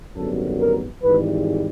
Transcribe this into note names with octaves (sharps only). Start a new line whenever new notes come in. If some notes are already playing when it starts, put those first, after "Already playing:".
G#1 F#2 D3 G3 B3 A4
A#4
G#1 G#2 E3 G3 B4